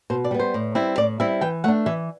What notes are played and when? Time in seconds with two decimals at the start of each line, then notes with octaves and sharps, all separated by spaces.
0.10 B2 C5
0.24 D5
0.31 G3 B3
0.39 C5
0.54 A2
0.75 G3 C4 E4
0.98 A2 D5
1.20 G3 C4 E4 E5
1.41 E3 G5
1.64 A3 D4 F#5
1.86 E3 E5